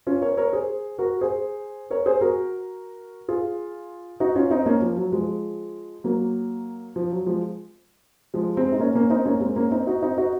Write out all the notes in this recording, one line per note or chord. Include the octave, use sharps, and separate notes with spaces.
C#4 F4
A#4 C#5
A#4 C#5
G#4 C5
F#4 A#4
G#4 C5
A#4 C#5
G#4 C5
F#4 A#4
F4 G#4
D#4 F#4
C#4 F4
C4 D#4
A#3 C#4
F3
F#3
F3 G#3
F#3 A#3
F3
F#3
F3 G#3
F3 G#3
G#3 C4
D#4
A#3 C#4
A#3 C#4
C4 D#4
A#3 C#4
G#3 C4
A#3 C#4
C4 D#4
D#4 F#4
C4 D#4
D#4 F#4